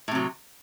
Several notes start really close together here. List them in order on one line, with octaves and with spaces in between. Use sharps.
A2 C3 F#3